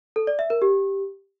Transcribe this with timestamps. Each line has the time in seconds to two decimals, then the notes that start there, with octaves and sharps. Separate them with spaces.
0.16 A4
0.27 D5
0.39 E5
0.50 A#4
0.62 G4